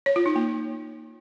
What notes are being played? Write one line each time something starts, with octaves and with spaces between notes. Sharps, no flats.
C#5
F4
D#4
A#3